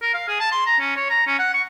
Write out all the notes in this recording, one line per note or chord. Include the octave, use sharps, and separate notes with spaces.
A#4
F5
G#4
A5
C6
A#5
C#4
C#5
A#5
C#4
F#5
C#6